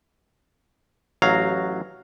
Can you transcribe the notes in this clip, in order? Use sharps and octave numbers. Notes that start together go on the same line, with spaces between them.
A1 F#3 F5 A#5